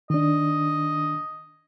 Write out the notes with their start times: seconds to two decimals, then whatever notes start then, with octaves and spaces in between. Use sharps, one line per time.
0.10 D#3 D4 D#5